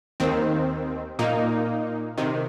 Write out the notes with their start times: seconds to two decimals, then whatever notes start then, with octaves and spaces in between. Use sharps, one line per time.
0.20 D#2 D#3 C4
1.19 A#2 A#3 D#4
2.18 C3 D#3